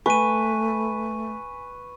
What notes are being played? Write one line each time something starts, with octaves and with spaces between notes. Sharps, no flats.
A3 B4 G#5 C#6 D#7